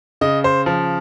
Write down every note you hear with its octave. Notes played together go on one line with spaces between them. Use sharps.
C#3 D#5
C5
F3